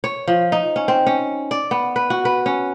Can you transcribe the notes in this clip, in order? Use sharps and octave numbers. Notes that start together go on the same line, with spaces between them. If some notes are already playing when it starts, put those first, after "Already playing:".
C#5
F3
D#4
C#4
C4
C#4
D5
B3
B4
F#4
B4
C#4